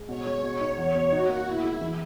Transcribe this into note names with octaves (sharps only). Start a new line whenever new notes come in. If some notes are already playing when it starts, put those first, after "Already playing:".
Already playing: G#3
B2 C#5
G#3
B2 C#5
D#4
E2 C#5
B2
D#4 F#4
A#3
B2 E4
G#3
E3